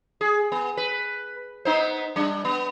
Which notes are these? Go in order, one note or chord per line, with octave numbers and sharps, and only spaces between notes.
G#4
B3
B4
B3 D#4 C5
G3 D4
B3